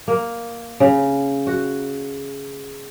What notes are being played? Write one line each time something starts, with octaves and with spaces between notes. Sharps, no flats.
A#3
C#3
F#4